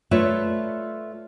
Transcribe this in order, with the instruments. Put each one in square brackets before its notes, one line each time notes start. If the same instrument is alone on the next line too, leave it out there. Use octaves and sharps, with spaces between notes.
[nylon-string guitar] A3 F4 B4 C#5 D5 E5